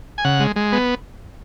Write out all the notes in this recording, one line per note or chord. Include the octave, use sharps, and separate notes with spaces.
G#5
C#3 F#5
G#3
G#3
B3